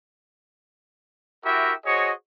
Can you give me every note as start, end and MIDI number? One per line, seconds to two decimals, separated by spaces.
1.45 1.73 64
1.45 1.73 66
1.45 1.73 67
1.45 1.73 70
1.45 1.73 76
1.45 1.73 79
1.86 2.12 66
1.86 2.12 68
1.86 2.12 72
1.86 2.12 73
1.86 2.12 75
1.86 2.12 85